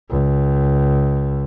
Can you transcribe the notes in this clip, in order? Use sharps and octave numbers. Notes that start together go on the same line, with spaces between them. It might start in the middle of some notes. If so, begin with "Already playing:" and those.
C#2